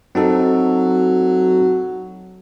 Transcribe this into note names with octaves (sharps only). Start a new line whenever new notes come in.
F#3 C4 D#4 A4